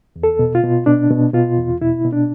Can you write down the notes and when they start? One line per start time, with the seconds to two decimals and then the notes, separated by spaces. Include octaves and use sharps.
0.16 E2
0.23 A4
0.39 B2
0.55 F4
0.64 B2
0.86 B2 D4
1.10 B2
1.33 B2 F4
1.57 E2
1.81 B2 E4
2.05 B2
2.12 D4